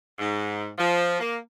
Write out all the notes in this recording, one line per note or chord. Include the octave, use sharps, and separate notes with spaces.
G#2
F3
A#3